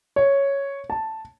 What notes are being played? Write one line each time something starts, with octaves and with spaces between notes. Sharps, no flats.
C#5
A5